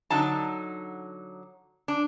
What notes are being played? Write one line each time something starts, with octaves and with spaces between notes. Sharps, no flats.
D3 F#3 D#4 A5
D4